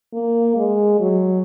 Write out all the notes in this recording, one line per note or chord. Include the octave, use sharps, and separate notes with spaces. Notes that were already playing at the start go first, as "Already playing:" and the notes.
A#3
G#3
F#3